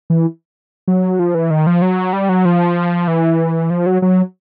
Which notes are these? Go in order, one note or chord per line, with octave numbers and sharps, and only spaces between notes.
E3
F#3
F3
E3
D#3
F3
F#3
G3
F#3
F3
E3
F3
F#3
F#3